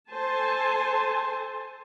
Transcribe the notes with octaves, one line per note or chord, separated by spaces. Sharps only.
A4 C5 G#5 A5